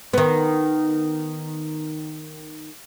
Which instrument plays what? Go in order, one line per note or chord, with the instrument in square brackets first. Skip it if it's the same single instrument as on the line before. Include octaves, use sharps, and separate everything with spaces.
[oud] D#3 B3